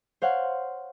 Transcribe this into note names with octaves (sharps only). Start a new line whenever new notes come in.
C5 C#5 F5 F#5